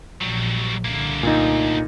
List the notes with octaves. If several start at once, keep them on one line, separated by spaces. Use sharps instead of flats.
A#1 F#3 G3
C2 D3 A#3 E4
D2 A#2 D#4